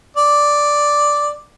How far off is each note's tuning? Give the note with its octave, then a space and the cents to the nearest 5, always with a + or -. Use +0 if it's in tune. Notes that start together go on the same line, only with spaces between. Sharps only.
D5 +0